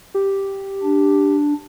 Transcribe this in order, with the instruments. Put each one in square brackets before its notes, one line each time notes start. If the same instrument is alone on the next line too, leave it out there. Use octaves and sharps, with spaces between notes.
[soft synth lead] G4
[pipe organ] D4